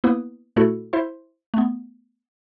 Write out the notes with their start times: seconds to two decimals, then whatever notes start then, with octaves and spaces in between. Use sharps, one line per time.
0.04 A#3 B3 E4 B4 D#6
0.56 A#2 A3 E4 F#4 A4
0.93 E4 C5 E5 C6
1.54 A3 B3